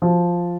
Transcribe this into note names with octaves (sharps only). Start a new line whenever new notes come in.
F3